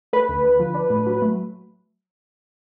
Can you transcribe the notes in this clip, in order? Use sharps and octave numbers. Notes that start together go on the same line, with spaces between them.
A3 B4
D2
D3
F3
D4
A2
F#3
A3